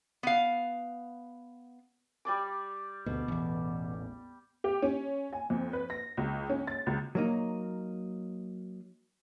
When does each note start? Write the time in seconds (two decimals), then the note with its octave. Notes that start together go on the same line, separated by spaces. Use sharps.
0.23 B3 F5
2.25 G3 D5 D6
3.06 D2 B2
3.28 A1 E2
4.64 G4
4.82 C#4
5.33 G#5
5.50 F2
5.73 B4
5.90 A#6
6.17 C#2
6.49 C#4
6.67 A6
6.86 C#2
7.15 F#3 A#3 D#4